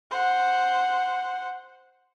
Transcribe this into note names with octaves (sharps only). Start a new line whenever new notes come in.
C5 F#5